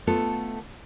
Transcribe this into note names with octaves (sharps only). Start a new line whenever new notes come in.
A3 B3 F4 A4